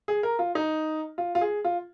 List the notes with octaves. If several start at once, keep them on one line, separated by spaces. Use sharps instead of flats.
G#4
A#4
F4
D#4
F4
F4
G#4
F4